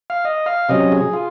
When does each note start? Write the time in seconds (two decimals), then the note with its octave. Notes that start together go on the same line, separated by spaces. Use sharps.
0.10 F5
0.25 D#5
0.46 F5
0.69 C3 F#3 C#4 D#5
0.92 G#4
1.13 F4